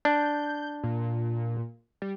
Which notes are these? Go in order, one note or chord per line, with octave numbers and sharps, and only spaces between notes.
D4 G6
A#2
G3